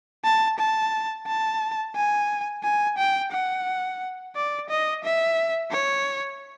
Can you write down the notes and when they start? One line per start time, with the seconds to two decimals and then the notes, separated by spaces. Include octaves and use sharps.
0.24 A5
0.59 A5
1.27 A5
1.95 G#5
2.64 G#5
2.98 G5
3.32 F#5
4.35 D5
4.69 D#5
5.04 E5
5.71 C#5